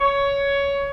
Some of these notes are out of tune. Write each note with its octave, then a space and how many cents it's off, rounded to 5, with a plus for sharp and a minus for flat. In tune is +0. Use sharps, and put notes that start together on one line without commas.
C#5 +15